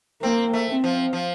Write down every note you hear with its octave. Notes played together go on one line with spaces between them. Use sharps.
A#3 C4
A3
C4
F3
F3